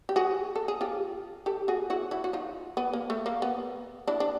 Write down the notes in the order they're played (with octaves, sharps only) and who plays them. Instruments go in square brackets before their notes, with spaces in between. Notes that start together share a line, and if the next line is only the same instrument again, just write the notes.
[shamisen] G4
F#4 G#4
A4
G#4
F4 G4
G4 A4
F#4 G#4
E4 F#4
E4 F#4
F#4
D#4 F4
B3
A#3
A3
A#3
B3
D4 E4
D4